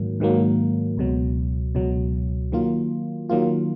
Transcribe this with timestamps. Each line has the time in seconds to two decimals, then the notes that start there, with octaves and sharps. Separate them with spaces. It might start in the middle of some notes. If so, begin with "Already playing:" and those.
Already playing: G#2 D#3 F#3 A#3
0.20 G#2 D#3 F#3 A#3
0.97 C#2 B2 F#3
1.75 C#2 B2 F#3
2.52 D#3 F#3 A#3 F4
3.29 D#3 F#3 A#3 F4